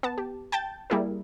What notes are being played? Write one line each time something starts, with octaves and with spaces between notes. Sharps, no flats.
B3 A5
G4
G5 A5 G6 A6
G3 A#3 E4 G#4 A#4